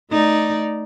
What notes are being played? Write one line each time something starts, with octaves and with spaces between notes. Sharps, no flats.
A3 D#4 D5